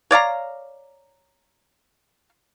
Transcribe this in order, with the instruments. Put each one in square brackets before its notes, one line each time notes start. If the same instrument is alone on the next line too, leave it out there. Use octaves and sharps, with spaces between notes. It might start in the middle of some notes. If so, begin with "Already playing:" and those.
[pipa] C#5 D5 F5 A#5